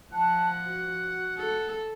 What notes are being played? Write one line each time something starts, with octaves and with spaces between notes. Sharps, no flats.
F3 F#5 A5
F#4
A4